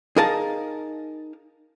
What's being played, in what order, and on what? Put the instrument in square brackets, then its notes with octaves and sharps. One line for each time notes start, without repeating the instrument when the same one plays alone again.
[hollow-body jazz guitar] D#4 G#4 A#4 F5 A5